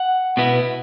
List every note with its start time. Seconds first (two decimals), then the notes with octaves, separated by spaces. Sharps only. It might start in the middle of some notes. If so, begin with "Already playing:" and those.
Already playing: F#5
0.37 B2 B3 E4